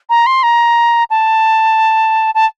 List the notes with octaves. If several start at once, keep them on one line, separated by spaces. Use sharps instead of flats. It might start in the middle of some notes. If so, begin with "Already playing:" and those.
A#5
C6
A#5
A5
A5